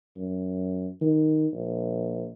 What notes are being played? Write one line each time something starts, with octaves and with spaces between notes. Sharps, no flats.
F#2
D#3
A#1